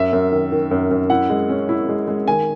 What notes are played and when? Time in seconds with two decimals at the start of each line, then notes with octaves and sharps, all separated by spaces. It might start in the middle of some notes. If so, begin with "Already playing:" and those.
Already playing: F#2 E5
0.13 F#2
0.32 D#3
0.52 D#3
0.71 F#2
0.91 F#2
1.10 E4 F#5
1.30 G#3
1.49 C#4
1.69 E4
1.89 G#3
2.08 G#3
2.28 D#3 G#5